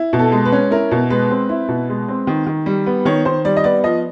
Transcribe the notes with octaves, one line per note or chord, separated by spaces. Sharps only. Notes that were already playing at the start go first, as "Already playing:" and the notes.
Already playing: E4
B2
A4
G#3
B4
C#4
E4 A#4
B2
G#3 B4
C4
E4
B2
G#3
C4
D#3
D#3
G3
B3
D#3 C#5
D#3 C5
G3 D5
D#5
B3 D5
F3 D#5